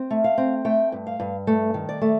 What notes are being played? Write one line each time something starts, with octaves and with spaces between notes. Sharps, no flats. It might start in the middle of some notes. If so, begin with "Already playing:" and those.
Already playing: C4
A3
F5
C4
A3 G5
G2
F5
G2
A3
D#3
D5
A3